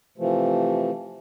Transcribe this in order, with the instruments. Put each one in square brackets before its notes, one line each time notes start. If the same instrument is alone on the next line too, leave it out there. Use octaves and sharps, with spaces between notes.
[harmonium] C3 E3 F3 A3